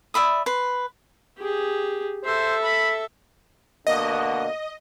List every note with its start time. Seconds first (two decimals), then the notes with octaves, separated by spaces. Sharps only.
0.14 D5 E5 B5 D#6
0.46 B4 C6
1.38 G4 G#4
2.25 A4 C5 E5
2.64 B5
3.87 B2 D3 A#3 D#5